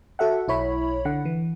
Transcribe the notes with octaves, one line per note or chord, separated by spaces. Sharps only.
F#4 A4 E5 F#5
B1 E4 C#5 B5
D3 F#5
E3